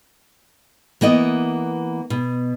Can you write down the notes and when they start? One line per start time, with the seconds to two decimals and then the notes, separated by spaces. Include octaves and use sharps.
1.01 E3 A#3 B3 D#5
2.10 B2